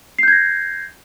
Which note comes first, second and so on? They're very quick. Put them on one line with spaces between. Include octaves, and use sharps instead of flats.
C7 G6 G#6 A#6